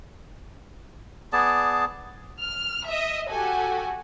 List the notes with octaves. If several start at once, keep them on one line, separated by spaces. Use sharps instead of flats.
B3 G#4 D5 A5
F6
D#5 E5
F#4 G4 A4 G#5